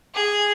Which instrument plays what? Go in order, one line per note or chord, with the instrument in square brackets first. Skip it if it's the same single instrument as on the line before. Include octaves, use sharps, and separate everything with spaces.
[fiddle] G#4